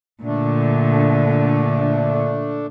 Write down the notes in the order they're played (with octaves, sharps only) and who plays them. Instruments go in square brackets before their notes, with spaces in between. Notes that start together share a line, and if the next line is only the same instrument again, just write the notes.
[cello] A#2 D3 [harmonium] A3 D4